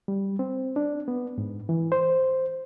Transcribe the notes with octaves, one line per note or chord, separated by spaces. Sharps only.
G3
C4
D4
B3
G#2
E3
C5